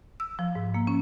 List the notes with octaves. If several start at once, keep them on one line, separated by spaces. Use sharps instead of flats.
E6
F3
G#2
A#3
C#4